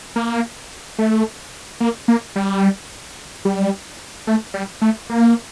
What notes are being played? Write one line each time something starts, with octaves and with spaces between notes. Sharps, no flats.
A#3
A3
A#3
A#3
G3
G3
A3
G3
A3
A#3